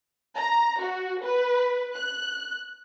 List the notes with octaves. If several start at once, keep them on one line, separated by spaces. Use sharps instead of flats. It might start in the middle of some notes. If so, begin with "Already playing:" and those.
A#5
F#4
B4
F#6